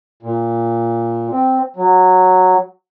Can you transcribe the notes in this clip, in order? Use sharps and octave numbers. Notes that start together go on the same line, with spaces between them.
A#2
C4
F#3